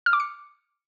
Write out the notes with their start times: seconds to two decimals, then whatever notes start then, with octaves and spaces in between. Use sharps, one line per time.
0.06 F6
0.13 D6
0.20 C#7